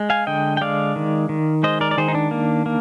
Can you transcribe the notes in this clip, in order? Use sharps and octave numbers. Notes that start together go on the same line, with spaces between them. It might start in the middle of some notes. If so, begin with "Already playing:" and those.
Already playing: G#3
F5 G#5
D3 D#5 G5
G5
G#3 D5 F5
D#3
D#3
G#3 C5 D#5
A#4 D5
D5
D#3 G#4 C5
D#4
D4
A#3
A#3